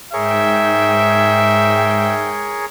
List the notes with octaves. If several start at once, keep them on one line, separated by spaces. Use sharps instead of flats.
G#2 G#4 A#4 C#5 E5 G5